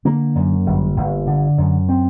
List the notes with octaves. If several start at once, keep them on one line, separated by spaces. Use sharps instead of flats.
D3 A#3
F#2
G1
G1
D3
F#2
C4